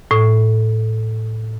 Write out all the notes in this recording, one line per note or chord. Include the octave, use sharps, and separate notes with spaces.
A2